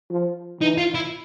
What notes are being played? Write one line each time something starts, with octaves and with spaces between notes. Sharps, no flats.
F3
E3 D#4
F4
E4